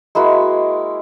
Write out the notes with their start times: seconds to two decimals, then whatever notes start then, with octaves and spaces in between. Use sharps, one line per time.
0.15 G#3 A#3 E4 F#4